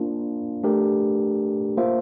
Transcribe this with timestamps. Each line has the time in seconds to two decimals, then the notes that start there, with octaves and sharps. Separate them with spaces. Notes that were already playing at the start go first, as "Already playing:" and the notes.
Already playing: A#3 D4 F4
0.63 A3 D4 G4 A#4
1.77 A#3 F4 C5 E5